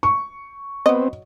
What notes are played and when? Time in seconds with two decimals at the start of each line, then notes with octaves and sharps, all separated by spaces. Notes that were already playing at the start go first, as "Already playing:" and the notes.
0.03 C#6
0.86 F#3 B3 C4 D#5